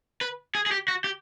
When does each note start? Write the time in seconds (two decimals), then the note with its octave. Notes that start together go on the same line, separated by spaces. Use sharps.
0.21 B4
0.55 G#4
0.66 G#4
0.72 G4
0.88 F#4
1.04 G4